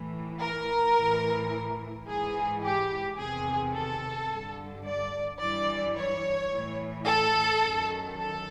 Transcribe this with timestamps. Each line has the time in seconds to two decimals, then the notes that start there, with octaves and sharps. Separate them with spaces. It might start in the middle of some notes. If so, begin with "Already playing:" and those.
Already playing: A2 E3
0.42 A#4
0.97 A2 E3
2.07 E3 G#4
2.13 G#2
2.63 G4
3.18 E2 C3 D#3 G#4
3.73 A4
4.29 G2 D3
4.84 D5
5.40 G2 E3 D5
5.95 C#5
6.51 A2 E3
7.05 A4
7.61 F#2 D#3
8.17 A4